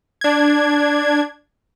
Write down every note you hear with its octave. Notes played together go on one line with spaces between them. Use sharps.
D4 G#6